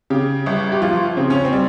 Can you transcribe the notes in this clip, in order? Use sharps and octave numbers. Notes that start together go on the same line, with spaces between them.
C#3 G4
G1
G4
F3 F4
C#3 C4
C#4
C4
G3